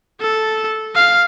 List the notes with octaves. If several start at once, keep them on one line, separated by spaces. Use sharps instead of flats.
A4
F5